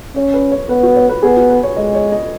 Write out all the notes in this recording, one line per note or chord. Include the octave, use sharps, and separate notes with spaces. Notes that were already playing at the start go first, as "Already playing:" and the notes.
C#4 C#5
B4
C#5
B3 B4
F#4
C#5
B4
B3 G#4
F#4
B4
C#5
G#3 D#5
C#5
D#5